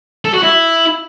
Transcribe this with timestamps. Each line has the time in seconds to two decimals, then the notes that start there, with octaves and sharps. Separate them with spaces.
0.25 A4
0.34 F#4
0.43 E4